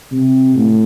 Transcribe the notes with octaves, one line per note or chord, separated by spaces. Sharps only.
C3
A2